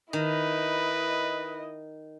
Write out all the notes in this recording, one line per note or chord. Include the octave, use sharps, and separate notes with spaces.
D#3 E4 B4 D#5